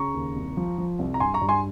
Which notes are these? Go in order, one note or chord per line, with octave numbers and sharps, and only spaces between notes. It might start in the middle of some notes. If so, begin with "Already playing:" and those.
Already playing: C#3 A#5 C#6
D#2
C2
F3
F3
C2
A#5
G2 G#5 C6
A#5 C#6
G2
G#5 C6